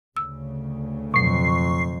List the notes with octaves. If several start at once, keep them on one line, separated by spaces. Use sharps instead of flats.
D2 C#3 E6
F2 B2 F#3 C#6 C7